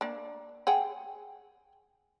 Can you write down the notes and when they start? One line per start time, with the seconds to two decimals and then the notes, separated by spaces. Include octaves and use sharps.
0.01 A#3 D4
0.67 G#4 F#5 G5